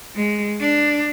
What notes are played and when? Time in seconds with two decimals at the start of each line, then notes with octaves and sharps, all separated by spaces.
0.16 G#3
0.61 D4